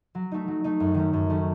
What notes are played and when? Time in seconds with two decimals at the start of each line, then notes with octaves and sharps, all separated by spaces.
0.15 F#3
0.32 A3 D#4
0.48 F#3
0.64 A3 D#4
0.80 F#2
0.94 D#3 A3 C#4
1.13 F#2
1.30 D#3 A3 C#4